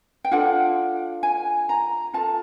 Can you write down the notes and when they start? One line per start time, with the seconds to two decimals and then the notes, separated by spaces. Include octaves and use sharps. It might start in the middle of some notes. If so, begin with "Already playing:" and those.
0.25 G5
0.31 D4 F4 A4 F#5
1.23 G#5
1.69 A#5
2.14 F4 A4 A5